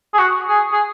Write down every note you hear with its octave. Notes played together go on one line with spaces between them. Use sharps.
G#4
F#4
G#4
G#4